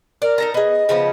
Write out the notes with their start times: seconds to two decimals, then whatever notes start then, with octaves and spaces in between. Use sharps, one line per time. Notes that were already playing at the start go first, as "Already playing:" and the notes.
0.22 A#4 D5
0.38 D#4 A4 A#5
0.54 B3 G#4 D#5
0.89 C#3 F3 B3